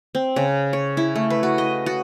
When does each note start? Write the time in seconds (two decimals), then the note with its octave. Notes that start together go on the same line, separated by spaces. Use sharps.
0.15 C4
0.36 C#3
0.73 C#5
0.97 E4
1.15 A3
1.30 B4
1.43 F#4
1.58 D#5
1.86 F#4